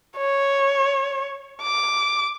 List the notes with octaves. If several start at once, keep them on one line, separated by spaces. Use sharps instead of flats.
C#5
D6